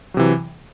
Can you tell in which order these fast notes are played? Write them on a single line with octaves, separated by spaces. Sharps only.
F#3 C3 E3